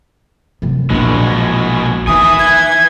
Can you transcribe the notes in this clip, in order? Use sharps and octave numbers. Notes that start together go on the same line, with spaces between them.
F#2 C3
A#1 E2 B2 G#3
D#3 B4 E5 G#5 D#6
G#6